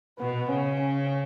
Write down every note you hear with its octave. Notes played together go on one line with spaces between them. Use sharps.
B2 B3
C#3 C#4
C#4